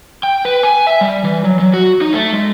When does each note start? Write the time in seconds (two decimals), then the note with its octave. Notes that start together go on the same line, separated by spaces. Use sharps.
0.23 G5
0.45 B4
0.63 G#5
0.87 E5
1.01 G3
1.24 E3
1.44 F#3
1.59 F#3
1.73 F#4
2.01 D#4
2.13 A3
2.34 G#3